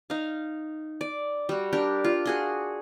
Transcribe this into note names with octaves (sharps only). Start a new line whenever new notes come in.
D#4 F5
D5
G3 F#4
D4 G4 A#4
F4
F#4 G#4 C6